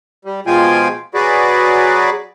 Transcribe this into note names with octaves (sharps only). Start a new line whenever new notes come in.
G3
B2 F3 G#3 F4 G5 G#5
F#3 F#4 G#4 B4 D5